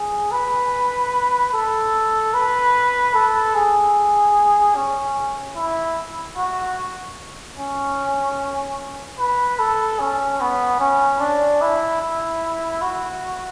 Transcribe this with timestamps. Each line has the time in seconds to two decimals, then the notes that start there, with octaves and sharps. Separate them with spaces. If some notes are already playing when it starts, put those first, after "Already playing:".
Already playing: G#4
0.32 B4
1.54 A4
2.34 B4
3.14 A4
3.55 G#4
4.76 C#4
5.56 E4
6.36 F#4
7.58 C#4
9.19 B4
9.59 A4
10.00 C#4
10.41 B3
10.80 C#4
11.20 D4
11.61 E4
12.01 E4
12.82 F#4